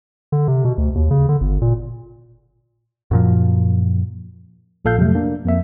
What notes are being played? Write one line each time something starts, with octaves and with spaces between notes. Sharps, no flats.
D3
C3
B2
D2
D#2
C#3
D3
G1
A#2
F#2 A#2 F3
A#1 A#2 A4 F5 G6
F2 C3 F#3 A3
A#3 D4
F2 A#3 E5